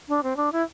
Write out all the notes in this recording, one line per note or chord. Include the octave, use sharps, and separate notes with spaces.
D4
C4
D4
E4